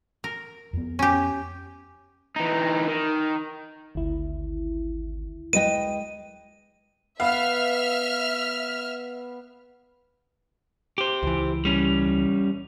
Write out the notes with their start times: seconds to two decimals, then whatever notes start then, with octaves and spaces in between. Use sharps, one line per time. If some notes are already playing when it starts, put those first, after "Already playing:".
0.24 A#4
0.73 F2 B3
0.99 C#4 G4
2.36 E3 D#4
2.88 D#3
3.95 G#1 D2 E4
5.53 G#3 B4 D#5 G5 D#7
7.20 B3 B4 E5 F5 F6
10.98 G4 C5
11.23 C#2 E3
11.65 G3 C#4